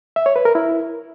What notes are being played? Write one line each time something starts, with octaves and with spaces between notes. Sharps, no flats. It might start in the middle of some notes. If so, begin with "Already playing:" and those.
E5
C#5
B4
A#4
E4